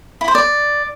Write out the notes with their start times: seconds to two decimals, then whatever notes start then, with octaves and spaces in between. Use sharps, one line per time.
0.21 E4
0.28 C5
0.35 D5